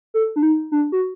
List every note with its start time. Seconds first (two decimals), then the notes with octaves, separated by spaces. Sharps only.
0.14 A4
0.36 D4
0.43 D#4
0.72 D4
0.92 F#4